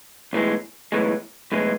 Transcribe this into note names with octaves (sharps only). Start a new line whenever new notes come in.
B1 A2 E3 G#3
B1 A2 E3 G#3
B1 A2 E3 G#3